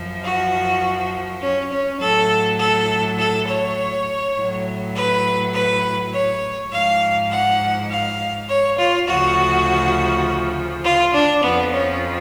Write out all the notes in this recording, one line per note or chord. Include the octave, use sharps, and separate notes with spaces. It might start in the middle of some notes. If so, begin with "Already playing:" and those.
Already playing: F#2 F3
F#4
C#4
C#4
A2 F#3 A4
A4
A4
C#5
A2 F#3
B4
B4
C#5
G#2 F3 F5
F#5
F5
C#5
F4
D2 C#3 F3 F#4
F4
D4
F2 F3 B3
C#4